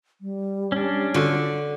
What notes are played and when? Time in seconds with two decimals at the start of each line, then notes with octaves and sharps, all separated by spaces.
0.21 G3
0.72 C#4 D4
1.14 D3 F4 F#4 A4